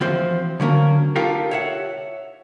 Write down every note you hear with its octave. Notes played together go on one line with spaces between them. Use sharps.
E3 F3 C4 F#4 C5
D3 F#3 A#3 C#4
D#4 F4 G4 A4 A#4
C#5 E5 F#5